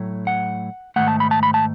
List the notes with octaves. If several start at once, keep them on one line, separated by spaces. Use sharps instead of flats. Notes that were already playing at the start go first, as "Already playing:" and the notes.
Already playing: A2 F#3 A3
F#5
G#2 D#3 A3 F#5
A5
B5
A5
B5
A5